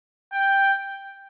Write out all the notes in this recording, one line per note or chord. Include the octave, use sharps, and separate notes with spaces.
G5